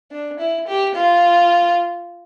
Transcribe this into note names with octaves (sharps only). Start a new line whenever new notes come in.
D4
E4
G4
F4